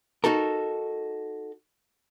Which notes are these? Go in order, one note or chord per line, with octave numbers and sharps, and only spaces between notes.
D#4 F#4 A4 A#4